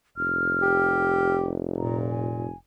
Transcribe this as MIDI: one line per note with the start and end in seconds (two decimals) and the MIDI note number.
0.17 2.53 29
0.17 1.35 89
0.62 1.53 67
1.78 2.46 46
1.78 1.97 82
2.09 2.57 80